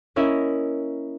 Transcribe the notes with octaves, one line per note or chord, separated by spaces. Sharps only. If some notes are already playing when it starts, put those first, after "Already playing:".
A#3 C#4 E4 A#4 D#5 E5